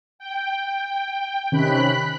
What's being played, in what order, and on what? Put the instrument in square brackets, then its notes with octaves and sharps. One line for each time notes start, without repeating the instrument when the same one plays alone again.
[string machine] G5
[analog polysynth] C3 D#3 C#4 [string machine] B5 F#6 B6